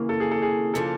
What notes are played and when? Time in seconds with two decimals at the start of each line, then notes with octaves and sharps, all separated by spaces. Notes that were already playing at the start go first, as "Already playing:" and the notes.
Already playing: D#2 C#3 E3 A#3
0.09 A4
0.20 G#4
0.31 A4
0.42 G#4
0.74 C#3 F3 A#3 D4 A4